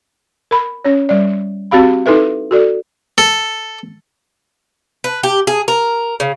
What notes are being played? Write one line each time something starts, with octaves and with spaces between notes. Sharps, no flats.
A#4 B5
C#4 C#5
G3 D5
C4 F#4 G4 F5 B5
D#4 E4 A4 B4 E5
F#4 A4 D5
A4
B4
G4
G#4
A#4
C#3